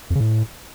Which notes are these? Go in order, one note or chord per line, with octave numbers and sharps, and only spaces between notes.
F2
C#3
A2